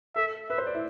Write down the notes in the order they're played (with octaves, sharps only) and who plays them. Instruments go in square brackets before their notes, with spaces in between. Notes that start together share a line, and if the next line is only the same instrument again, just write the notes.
[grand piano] A4 [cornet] E5
[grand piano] B4 [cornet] E5
[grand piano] C5
D5
E4